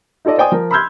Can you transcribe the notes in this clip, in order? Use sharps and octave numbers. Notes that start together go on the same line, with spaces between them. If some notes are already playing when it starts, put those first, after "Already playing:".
D#4 F4 A4 D5 D#5
C5 D5 G5 G#5 D#6
F3 A#4
B5 C6 E6 F6 G6 G#6